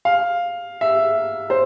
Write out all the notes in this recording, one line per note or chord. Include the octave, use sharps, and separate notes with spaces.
F5
E5
C5